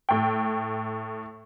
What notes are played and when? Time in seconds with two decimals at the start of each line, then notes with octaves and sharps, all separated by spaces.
0.09 A2 G5